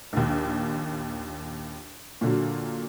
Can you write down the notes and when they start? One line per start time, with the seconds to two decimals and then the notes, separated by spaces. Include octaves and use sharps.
0.13 A#1 D#2
2.21 A#2 D3 F#3